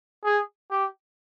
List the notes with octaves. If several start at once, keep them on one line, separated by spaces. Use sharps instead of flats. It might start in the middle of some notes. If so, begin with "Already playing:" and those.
G#4
G4